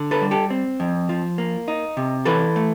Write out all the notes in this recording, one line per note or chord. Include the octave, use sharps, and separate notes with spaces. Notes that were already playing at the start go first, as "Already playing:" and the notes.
Already playing: D3
A4 B4
G3
G4 A4
C4
F2
F3
A#3
D#4
C3
E3 A4 B4
A3